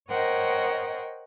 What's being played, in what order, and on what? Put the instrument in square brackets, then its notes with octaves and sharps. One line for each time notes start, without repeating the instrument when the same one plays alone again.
[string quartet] A#4 C5 C#5 D#5 F#5 G5